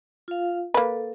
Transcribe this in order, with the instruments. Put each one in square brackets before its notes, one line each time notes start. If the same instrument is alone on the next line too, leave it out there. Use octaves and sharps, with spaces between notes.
[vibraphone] F4 F5
[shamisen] A#3 B4 [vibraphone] A4